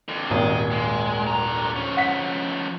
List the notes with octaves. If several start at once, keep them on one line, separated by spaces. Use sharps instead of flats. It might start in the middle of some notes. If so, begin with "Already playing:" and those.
F2 D3
D#1 G#1 D#2 G#4 D#5
G#3
D3 A#5
F3 C#4
F#5 B6